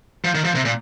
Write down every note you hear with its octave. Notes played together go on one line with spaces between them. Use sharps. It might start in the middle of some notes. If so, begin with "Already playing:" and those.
F3
D#3
F3
C3
A#2